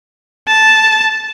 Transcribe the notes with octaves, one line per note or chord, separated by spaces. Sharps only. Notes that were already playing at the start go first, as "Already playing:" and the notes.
A5